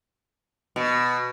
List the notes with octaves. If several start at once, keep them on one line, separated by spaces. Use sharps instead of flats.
B2